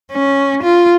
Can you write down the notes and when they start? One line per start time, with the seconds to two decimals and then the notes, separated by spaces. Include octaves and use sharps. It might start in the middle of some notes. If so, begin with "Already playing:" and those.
0.12 C#4
0.63 F4